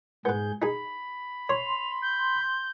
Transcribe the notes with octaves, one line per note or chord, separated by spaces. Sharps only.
G#2 B3 G#4 B4 G6
D#4 G#4 B5
C#5 C6 F7
G6